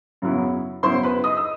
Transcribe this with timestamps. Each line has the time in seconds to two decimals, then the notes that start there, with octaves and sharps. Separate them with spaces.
0.22 F#2 C#3 F#3 B3 E4
0.83 F#2 C#3 F#3 B3 E4 C5 C6
1.03 B4 B5
1.24 D#5 D#6
1.37 E6